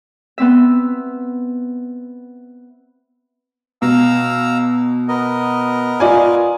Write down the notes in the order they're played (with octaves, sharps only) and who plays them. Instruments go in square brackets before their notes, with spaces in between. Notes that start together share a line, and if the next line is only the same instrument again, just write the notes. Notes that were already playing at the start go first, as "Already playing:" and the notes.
[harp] B3 C4 E5
[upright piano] B2 [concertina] F5 A#5 E6
[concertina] B3 A#4 D#5
[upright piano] F4 D5 G#5